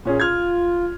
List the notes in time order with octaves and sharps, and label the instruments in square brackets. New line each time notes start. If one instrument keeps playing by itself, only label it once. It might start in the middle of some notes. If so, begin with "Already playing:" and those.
[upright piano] A#2 C#4 G#4
[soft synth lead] F4 [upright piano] F6 G#6